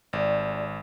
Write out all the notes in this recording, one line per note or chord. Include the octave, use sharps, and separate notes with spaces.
G#1 G3 D4